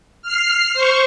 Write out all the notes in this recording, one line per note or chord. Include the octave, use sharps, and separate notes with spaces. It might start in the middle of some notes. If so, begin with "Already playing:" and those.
F6 C7
C5 C#6